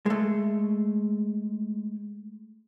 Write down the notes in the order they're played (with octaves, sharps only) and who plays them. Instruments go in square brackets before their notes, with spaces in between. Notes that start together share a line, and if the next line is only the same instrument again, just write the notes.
[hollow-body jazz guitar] G#3 A3